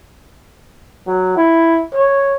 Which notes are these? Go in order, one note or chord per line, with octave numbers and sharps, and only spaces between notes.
F#3
E4
C#5